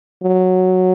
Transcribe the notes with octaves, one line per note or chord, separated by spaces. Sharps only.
F#3